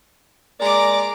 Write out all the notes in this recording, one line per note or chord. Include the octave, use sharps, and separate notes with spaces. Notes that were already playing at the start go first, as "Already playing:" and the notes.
G#3 A#3 D5 A#5 D6